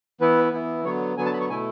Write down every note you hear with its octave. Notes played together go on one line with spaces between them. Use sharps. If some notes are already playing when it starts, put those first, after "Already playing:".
E3 B3 E4 B4
E3 B3 E4
D3 F#3 B3 C#5
D3 F#3 B3 G#5
A5
B5
C#6
B2 A3 E4 G#5